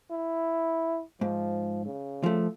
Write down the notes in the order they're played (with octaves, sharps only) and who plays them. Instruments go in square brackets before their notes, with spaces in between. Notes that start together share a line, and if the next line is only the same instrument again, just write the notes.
[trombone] E4
[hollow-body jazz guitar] G#2 [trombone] F3
[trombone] C#3
[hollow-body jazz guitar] F3 A3